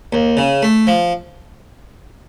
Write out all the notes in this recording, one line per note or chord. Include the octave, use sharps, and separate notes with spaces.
D#2
C#3
A3
F3